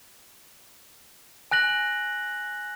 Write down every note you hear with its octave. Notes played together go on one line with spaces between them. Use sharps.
G#5 F#6 A#6 F#7